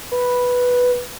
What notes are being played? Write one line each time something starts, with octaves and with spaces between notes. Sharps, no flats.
B4